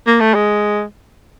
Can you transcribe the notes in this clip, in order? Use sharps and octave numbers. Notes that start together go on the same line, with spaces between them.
A#3
A3
G#3